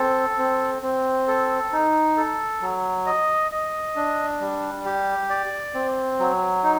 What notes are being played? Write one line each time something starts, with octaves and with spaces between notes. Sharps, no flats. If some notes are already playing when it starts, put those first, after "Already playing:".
Already playing: C4 A4
C4
C4
A4
D#4
A4
F#3
D#5
D#5
D4
G3
G4
D5
C4
F#3
D#4